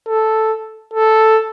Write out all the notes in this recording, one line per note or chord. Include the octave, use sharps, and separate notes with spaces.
A4
A4